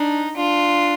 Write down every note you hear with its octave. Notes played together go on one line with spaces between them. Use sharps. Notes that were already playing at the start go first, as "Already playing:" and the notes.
Already playing: D4 D#4
D4 F4